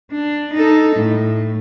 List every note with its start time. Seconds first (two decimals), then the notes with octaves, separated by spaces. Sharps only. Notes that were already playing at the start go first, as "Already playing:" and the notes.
0.12 D4
0.54 D#4 A4
0.96 A2